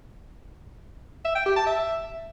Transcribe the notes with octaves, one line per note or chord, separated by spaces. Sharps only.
E5
G5
G4
A5
E5